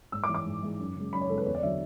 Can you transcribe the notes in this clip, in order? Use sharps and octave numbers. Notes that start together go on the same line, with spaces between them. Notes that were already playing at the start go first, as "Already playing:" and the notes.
G#2 E6
D6
E3 G#3
D6
G#2
E3 G#3
F#2
C#3 G#3
F#2 B5
C#5
C#3 G#3 A4
B4
E2 C#5
D5
D3 F#3 E5